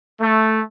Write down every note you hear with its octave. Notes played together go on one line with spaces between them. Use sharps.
A3